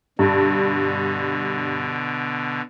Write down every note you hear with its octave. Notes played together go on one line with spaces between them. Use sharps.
G2 B2 D3